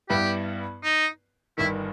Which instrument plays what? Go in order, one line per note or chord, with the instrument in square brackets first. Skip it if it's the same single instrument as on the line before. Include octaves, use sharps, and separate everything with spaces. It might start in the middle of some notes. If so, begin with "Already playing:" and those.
[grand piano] G2 G3 B3 E4 [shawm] G4
[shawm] D#4
[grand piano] G1 G2 D#3 [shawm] E4